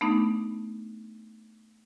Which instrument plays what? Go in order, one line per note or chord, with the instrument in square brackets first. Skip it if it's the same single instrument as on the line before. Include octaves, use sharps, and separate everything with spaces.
[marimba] A3 B3 D4 D#4